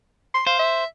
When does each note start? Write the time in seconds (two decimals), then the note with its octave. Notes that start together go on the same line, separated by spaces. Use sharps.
0.34 C6
0.47 C5 F5
0.59 E5